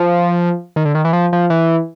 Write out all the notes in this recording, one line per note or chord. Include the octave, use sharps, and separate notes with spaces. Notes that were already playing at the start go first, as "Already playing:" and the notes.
Already playing: F3
D#3
D3
D#3
E3
F3
F3
E3